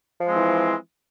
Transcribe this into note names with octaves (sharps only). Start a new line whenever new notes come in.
E3 F3 G#3 C4